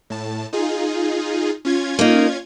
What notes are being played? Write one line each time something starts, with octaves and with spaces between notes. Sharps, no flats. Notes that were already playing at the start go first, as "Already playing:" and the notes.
A2 A5
D#4 F4 G#4
C#4 F4 G#6
A#3 D#4